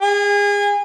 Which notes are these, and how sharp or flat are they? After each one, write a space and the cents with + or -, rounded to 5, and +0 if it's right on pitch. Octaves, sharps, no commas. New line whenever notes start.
G#4 -30